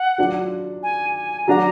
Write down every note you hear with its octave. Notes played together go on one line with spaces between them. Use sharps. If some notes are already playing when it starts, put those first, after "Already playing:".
Already playing: F#5
F#3 D4 F4
G#5
G#5
F#3 D4 F#4 A#5